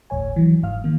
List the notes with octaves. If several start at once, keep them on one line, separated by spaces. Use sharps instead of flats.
G1 D2 A2 C#5 G#5
E3 F#3
G1 G#2 F5 F6
D#3 A#3